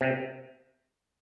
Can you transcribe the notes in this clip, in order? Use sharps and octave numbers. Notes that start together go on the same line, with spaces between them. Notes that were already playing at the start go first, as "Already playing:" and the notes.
C3